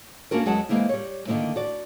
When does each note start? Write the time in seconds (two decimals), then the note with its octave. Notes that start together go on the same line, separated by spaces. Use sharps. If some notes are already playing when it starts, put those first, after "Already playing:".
0.31 A#3 C#4 D4 F#4 A#4
0.45 E2 F#3 G#3 F#5 A5
0.69 E3 F3 G#3 A#3 C4 E4
0.89 G3 C#5
1.28 D3 D#3 A#3 C4 E4
1.56 F#4 D5